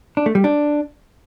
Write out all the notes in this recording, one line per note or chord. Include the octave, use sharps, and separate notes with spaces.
D4
A3
G3
D4